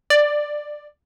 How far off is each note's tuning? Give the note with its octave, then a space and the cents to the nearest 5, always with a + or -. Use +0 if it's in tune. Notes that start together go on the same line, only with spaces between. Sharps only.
D5 +10